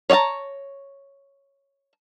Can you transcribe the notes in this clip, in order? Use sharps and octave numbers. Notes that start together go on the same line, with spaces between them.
C#5 D5 G5 A5 A#5